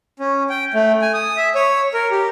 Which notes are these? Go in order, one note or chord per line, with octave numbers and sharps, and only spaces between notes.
C#4
G5
A3
G#5
D#6
E5
C#5
A#4
G4